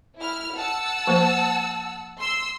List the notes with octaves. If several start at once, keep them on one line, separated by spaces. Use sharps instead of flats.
E4 F6
F#5 A5 E6
F3 A#3 C5
C6 E6